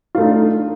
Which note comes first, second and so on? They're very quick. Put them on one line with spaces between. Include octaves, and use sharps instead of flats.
F4 A3 D#4 D4